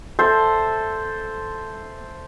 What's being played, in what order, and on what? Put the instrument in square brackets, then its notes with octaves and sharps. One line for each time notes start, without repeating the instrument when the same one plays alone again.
[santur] A4 C5 E5